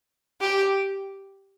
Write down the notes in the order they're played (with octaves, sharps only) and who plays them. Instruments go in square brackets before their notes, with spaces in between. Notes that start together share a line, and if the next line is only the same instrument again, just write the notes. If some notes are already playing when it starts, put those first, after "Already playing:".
[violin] G4